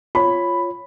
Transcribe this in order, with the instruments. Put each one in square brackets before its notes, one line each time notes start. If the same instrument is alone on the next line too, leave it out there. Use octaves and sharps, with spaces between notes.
[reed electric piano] F4 C#5 [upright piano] B5